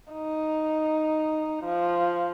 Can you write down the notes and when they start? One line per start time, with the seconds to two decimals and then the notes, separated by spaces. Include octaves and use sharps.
0.12 D#4
1.64 F3